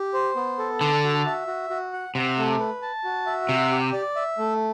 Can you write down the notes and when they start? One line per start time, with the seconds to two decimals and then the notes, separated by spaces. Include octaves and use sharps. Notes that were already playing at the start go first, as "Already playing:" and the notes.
Already playing: G4
0.14 C5
0.36 B3
0.58 A4
0.80 D3 A5
1.04 F#4
1.26 E5
1.47 F#4
1.70 F#4
1.93 F#5
2.15 C3 F#5
2.38 A3
2.59 B4
2.82 A5
3.04 F#4
3.26 E5
3.49 C3 F#5
3.71 G4
3.93 D5
4.16 E5
4.38 A3